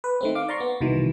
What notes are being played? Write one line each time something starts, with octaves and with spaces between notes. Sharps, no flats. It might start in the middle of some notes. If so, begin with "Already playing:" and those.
B4
D#3 A3 C4
F5 D6
D5 A#5 C6 C#6
B3
C2 B2 D#3 E3